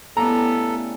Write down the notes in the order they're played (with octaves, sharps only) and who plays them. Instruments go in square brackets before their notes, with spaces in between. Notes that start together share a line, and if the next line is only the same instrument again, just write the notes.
[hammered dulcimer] A2 C#3 G3 [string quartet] B3 [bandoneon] A4 [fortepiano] A#5